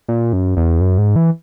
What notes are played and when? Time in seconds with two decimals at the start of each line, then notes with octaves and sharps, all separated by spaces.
0.08 A#2
0.33 F#2
0.57 E2
0.81 F#2
0.98 G#2
1.16 E3